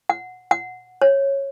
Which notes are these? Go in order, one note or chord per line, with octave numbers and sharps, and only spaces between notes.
F#5
F#5
C#5